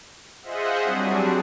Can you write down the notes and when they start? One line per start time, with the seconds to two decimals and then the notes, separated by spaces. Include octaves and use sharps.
0.42 F4 G#4 C5 D#5 E5 F#5
0.84 F#3 G3 C4 D4 F#4 G#4